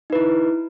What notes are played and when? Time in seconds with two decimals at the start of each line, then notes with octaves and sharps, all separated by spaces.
0.10 D#4
0.13 B4
0.15 E4